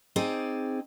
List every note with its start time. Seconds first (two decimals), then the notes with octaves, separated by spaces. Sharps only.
0.16 C4 D#4 G#4 C5 D5